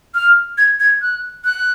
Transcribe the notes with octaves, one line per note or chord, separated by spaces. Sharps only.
F6
G#6
G#6
F#6
F#6